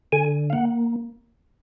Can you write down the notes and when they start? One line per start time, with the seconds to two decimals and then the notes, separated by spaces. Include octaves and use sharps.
0.12 D3 G#5
0.50 F5
0.53 A#3 F#5